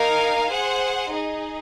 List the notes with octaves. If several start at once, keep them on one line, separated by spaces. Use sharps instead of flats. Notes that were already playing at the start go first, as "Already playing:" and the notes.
Already playing: D#4 A#4 F5 G#5
G#4 C5 F#5
D#4 G#4 D#5